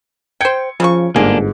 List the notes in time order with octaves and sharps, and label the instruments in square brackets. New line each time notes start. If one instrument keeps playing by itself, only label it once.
[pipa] C5 G5 [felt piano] G#6 C#7 D7
[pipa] C#3 F#4 C#6 [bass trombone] F3
[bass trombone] G1 [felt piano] G#2 [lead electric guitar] A#3 D4 [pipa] G#4